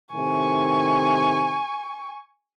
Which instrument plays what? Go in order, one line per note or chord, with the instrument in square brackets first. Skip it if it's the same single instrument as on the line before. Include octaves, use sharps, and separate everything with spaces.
[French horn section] A2 C3 D#3 [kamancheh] G#5 C#6